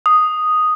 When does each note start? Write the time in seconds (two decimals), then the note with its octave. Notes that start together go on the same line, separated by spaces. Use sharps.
0.06 D#6